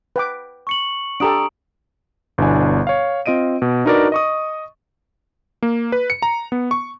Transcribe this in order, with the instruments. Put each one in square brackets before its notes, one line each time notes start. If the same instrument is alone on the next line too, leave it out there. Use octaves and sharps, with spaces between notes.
[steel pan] B4 G5 D6
[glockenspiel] C#6 C#7 F#7
[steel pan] D4 G4 A4 [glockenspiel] A#5 D#6 D7
[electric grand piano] G1 B2 D4 E4 D5 G#5
C#5 F5
C4 F4 D#5 D7 D#7
B2
D4 D#4 F#4 A#4 B4 D5
D#5 C#6 D#6
A#3
B4
C#7
A#5
B3
C#6